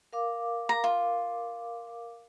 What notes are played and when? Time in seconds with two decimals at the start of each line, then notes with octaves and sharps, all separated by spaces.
0.13 A#4 F5 D6
0.69 A#5
0.84 F4